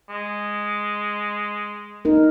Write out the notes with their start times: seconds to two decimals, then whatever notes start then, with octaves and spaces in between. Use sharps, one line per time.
0.09 G#3
2.05 D#4 A#4